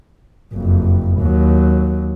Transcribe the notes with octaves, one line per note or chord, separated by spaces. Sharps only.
F#1 F2
D#2 F#3